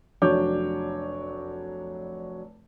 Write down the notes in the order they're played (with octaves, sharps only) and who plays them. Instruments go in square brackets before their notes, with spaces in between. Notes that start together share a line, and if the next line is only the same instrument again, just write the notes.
[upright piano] F1 F#3 D4 C#5 D6 G6